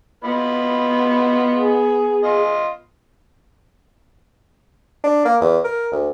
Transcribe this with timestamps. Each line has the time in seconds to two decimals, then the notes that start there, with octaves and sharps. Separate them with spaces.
0.25 B3 F4 D#5 B5
1.55 G#4
2.24 F4 D#5
5.04 D4
5.25 A#3
5.41 E2
5.64 A#4
5.92 D2